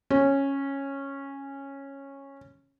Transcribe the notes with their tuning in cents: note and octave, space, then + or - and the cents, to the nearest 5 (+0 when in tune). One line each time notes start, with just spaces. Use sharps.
C#4 -10